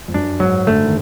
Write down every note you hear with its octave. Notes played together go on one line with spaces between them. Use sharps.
F2
F#2 D4
G#2 F#3
D3 A3
D#3